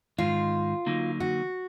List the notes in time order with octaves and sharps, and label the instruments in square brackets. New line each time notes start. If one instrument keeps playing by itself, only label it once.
[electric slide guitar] G#2 D#3 G#3 [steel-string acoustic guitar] F4
[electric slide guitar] D3 F#3 A#3 D#4
[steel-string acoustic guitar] F#4